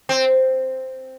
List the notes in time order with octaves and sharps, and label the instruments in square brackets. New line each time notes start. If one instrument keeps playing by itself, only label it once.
[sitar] C4